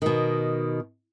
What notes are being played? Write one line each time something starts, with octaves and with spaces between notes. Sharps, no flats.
B2 D#3